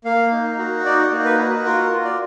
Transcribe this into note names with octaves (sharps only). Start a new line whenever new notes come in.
A#3 F5
D#4
F#4
D#4 D5
A#3
B4
F#4
F4 A#4
F4
D5